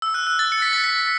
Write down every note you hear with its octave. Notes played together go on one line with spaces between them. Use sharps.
E6
F#6
F#6
A6
C#7
B6
A6
B6